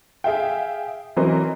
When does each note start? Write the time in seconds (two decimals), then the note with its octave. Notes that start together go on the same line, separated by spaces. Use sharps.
0.24 G#4 E5 F5 G5
1.17 E3 F#3 C4 A#4 C5 D#5